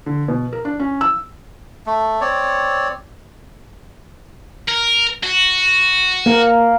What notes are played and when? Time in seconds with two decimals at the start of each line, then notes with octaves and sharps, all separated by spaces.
0.06 D3
0.28 B2
0.53 A#4
0.65 D4
0.80 C#4
1.01 E6
1.87 A3
2.21 C4 C#5 D5
4.68 A#4
5.23 F#4
6.26 A#3 A#4